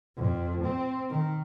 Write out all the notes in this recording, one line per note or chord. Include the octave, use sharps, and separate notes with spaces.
F2
C4
D#3